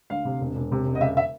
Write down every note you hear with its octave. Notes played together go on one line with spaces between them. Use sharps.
D2 F5
C3
E1
E1
C3
E1
D#5
C#3 E5
E5